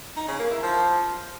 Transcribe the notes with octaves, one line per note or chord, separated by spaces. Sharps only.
D#4
C#3
A#3
E4
F3